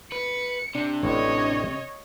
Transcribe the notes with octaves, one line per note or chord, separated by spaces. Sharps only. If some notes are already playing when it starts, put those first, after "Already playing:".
B4 C#7
C3 D4
A1 A2 C#5 D#5